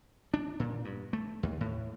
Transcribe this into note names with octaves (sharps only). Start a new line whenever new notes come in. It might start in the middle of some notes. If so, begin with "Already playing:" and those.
D4
A#2
G2
A3
D#2
A2